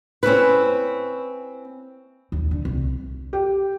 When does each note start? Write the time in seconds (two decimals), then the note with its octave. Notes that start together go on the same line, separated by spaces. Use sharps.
0.23 C4 C#4 E4 B4
2.32 D#2
2.51 D3
2.65 C2
3.33 G4